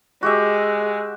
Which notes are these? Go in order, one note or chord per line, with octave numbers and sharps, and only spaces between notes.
G#3 F#4 G4 E5